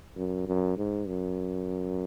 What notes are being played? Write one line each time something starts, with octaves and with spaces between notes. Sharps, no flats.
F#2
F#2
G#2
F#2